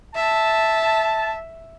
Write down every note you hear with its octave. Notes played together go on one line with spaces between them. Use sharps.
E5 A5